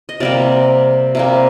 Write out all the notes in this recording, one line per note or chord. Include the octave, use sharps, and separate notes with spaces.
D#5
C3 G3 A#3 D5
C3 G3 A#3